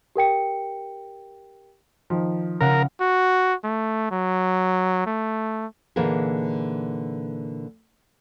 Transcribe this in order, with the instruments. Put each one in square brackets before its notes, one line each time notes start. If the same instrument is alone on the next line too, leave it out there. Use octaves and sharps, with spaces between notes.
[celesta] G4 A#4 G5 C#7
[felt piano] D#3 F3
[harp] C#3 F5 F#5 [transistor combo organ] A#4
[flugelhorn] F#4
A3
F#3
A3
[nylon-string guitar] A#2 D3 E3 A#3 D#4 G#4